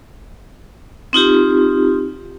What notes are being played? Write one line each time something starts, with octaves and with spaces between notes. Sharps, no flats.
C4 D#4 F4 G4